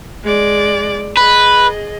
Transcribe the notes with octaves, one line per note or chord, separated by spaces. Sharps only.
G#3 D5
G#4 B4 D#5